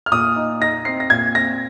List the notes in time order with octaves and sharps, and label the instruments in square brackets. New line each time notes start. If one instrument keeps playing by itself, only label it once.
[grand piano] F6
A#2 D#6
D#4
D#4 A#6
C4 C7
A#6
A#2 G#6
C4 A#6